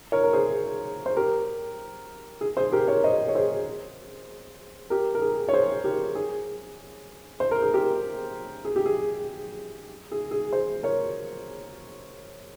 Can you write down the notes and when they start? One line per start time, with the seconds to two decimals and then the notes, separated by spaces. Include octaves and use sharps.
0.12 A#4 C#5
0.23 A#4
0.33 G#4 C5
1.06 C5
1.16 G4 A#4
2.41 G#4
2.57 G#4 C5
2.72 G4 A#4
2.88 A#4 C#5
3.04 C5 D#5
3.28 C#5
3.35 G#4 C5
4.90 G4 A#4
5.15 A#4
5.21 G#4
5.49 C#5
5.53 G#4 C5
5.84 G4 A#4
6.15 G#4
7.40 C5
7.51 A#4
7.62 G#4
7.74 G4 A#4
8.65 G#4
8.76 G4
8.86 G#4
10.12 G#4
10.31 G#4
10.53 G#4 C5
10.83 A#4 C#5